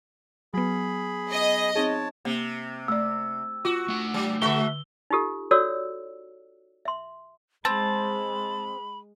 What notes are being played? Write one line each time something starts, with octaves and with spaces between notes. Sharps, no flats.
F#3 B3 G#4 B5
D#5
C4 D#4 G#4 C#5 A5
C3 A#3
A3 D5 E6
F4 F#4
A3 F#5
F#3
D3 G#3 F#4 E5 C#6 G7
D#4 F4 G4 A4
F#4 A4 C#5 D5 E6
E5 C6
G#3 C4 A5 B5